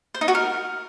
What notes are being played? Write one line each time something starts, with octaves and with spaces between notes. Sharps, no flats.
C5
D#4
F#4
A#4